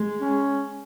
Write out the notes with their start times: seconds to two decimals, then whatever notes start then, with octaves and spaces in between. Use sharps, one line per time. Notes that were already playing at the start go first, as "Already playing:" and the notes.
Already playing: G#3
0.20 C#4